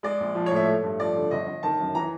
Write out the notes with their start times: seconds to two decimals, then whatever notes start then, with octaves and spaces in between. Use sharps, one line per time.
0.03 G#3 D5
0.20 A#1
0.35 F3
0.46 C#5
0.51 A2
0.56 E5
0.67 A3
0.83 G2
1.00 F3 D5
1.16 D3
1.31 G1 D#5
1.47 G1
1.63 D#3 A5
1.80 F#2
1.95 E3 A#5